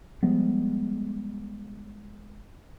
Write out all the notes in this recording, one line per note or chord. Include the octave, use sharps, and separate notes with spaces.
F3 G3 G#3 B3